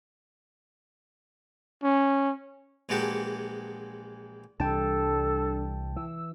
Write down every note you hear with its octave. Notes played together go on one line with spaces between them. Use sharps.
C#4
A#1 E3 G#3 F#4 G4 A5
C2 E3 G3 D4 A4 G5 A5
E3 E6